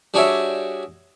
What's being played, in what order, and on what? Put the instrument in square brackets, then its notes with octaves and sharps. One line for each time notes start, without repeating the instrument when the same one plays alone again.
[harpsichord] G3 D4 F#4 G#4 C#5 E5